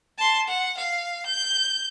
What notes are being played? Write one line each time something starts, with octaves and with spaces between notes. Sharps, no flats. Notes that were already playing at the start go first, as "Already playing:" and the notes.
A5 C6
F#5
F5
G6